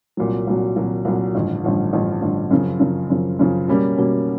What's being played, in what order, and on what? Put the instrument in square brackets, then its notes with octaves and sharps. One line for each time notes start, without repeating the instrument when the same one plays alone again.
[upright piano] C2 A#2 F#3
C2 A#2 F#3
C2 A#2 F#3
C2 A#2 F#3
A1 G2 D3 F3
A1 G2 D3 F3
A1 G2 D3 F3
A1 G2 D3 F3
F#2 C#3 F3
F#2 C#3 F3
F#2 C#3 F3
F#2 C#3 F3
B2 G3 A#3 C#4
B2 G3 A#3 C#4